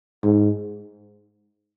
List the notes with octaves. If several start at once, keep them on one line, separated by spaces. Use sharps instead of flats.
G#2